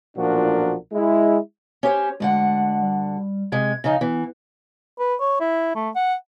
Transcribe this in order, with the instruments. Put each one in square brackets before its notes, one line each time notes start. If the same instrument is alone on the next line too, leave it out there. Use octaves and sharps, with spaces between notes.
[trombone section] B1 A#2 F3 D4 F#4 A#4
G#3 E4
[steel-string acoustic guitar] C#4 G4 C5 [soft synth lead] C#5
[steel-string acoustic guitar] D2 D3 F#5 [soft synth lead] G#3
[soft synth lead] G3
[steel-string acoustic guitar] C3 G#3 [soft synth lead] G#6
[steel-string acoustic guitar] C#3 F3 D#4 [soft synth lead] D#5
[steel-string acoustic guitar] E3 [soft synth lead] B3
[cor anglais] B4
C#5
E4
A3
F#5